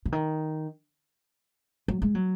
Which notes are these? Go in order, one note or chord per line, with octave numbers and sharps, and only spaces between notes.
C#3
D#3
F#3
G#3
F#3